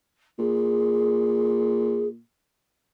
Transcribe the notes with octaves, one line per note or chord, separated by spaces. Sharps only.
A#2 G#4